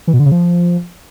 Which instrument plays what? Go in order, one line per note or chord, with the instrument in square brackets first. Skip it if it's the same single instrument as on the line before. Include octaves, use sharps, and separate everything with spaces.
[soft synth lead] E3
B2
D3
C#3
F3